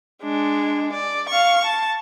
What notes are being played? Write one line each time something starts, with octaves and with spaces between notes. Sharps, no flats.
G#3 D4
D5
F5 C#6
A5